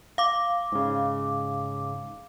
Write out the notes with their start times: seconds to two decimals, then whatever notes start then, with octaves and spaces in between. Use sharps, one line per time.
0.18 F5 D6
0.72 G#2 C#3